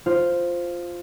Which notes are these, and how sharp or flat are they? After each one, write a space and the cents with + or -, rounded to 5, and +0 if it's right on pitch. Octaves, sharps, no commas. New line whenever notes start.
F4 +0 C5 +0